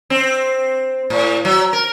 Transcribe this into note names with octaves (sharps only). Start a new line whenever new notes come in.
C4
A2
F#3
A#4